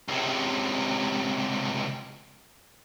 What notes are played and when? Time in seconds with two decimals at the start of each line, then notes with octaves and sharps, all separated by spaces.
0.08 C#2 C3